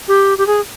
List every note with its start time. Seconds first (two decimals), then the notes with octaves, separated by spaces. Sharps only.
0.08 G4
0.38 G4
0.47 G#4